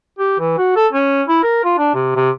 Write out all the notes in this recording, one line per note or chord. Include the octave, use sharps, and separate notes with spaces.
G4
E3
F#4
A4
C#4
E4
A#4
F4
D4
C3
C3